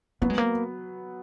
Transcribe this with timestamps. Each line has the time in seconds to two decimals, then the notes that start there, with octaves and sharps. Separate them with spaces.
0.22 F#3 A#3 B3 F#4
0.30 G#3
0.38 A#3